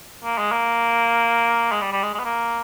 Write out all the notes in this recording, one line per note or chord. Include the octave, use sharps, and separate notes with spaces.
A#3
G#3
A#3
G#3
G3
G3
G#3
G#3
B3
A#3